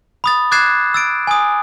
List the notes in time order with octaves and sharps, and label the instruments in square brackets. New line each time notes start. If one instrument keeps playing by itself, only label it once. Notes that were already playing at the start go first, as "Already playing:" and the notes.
[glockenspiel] B5 D#6 A6
D6 F#6 G#6 A6 C7 E7
E6 A6 D7
G#5 D#6